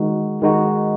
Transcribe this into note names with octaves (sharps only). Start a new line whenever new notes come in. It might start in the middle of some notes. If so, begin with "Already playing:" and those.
Already playing: D#3 G#3 D#4 F#4
D#3 G#3 D#4 F#4